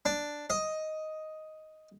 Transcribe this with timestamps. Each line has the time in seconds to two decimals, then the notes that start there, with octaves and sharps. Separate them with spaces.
0.06 D4
0.50 D#5